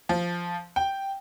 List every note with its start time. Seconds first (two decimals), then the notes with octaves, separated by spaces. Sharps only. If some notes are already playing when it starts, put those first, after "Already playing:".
0.09 F3
0.76 G5